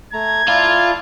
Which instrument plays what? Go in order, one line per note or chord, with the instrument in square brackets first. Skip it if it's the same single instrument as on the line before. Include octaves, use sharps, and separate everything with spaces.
[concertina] A3 A#5 [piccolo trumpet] G#6
[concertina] E4 D5 A5 [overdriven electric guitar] F4